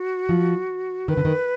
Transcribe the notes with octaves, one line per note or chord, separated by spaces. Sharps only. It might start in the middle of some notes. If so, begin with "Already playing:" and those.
Already playing: F#4
F3
D#3 B4
D3
D#3